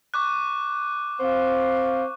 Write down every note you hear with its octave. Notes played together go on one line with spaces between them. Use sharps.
C#6 D6 F#6
C4 C5 F5